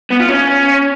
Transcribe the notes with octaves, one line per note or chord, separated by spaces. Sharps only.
B3
F4
C#4